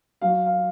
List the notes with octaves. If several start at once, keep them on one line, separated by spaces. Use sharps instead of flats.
F#3 F5
F5